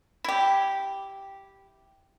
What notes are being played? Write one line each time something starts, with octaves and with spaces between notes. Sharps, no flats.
E4 G4